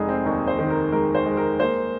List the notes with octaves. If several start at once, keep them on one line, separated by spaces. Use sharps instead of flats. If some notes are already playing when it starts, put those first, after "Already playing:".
Already playing: F1 G#3 D#4 G#4
C4
D#2 D#4
C5
D#3
A#4
G#3 A#4
C5
G#3
A#4
A#3 C5